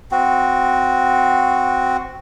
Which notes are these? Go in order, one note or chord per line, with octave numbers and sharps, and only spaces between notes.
C4 F#4